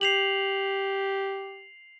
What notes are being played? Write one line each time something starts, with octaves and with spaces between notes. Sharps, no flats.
G4 C7 F7 F#7